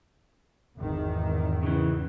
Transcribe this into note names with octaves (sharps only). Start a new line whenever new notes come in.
G#1 E2 D#3
C#3 E3